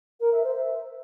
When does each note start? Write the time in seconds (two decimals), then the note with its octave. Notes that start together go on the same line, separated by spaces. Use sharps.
0.20 A#4
0.32 E5
0.44 C5
0.56 E5